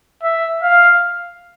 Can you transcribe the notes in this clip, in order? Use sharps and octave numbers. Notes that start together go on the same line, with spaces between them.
E5
F5